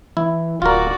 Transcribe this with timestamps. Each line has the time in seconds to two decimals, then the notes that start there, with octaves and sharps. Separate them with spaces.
0.17 E3 E4
0.62 D1 F4 F#4 A#4 D5